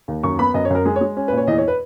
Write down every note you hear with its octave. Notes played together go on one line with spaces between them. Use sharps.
D#2
F#2 C#6
B3 B5
F#2 D#5
C#5
F#2 A#4
G#3 G#4
C#5
G#3
C#4
A#2 B4
C#5
E2 D#5
C#5
B4